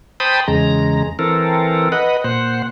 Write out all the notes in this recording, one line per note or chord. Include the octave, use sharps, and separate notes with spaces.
C5 G5 A5 B5 D#6
E2 C#3 G#3 A#5
E3 C4 A4 A#4
B4 D#5 F#5
A#2 C5 F#5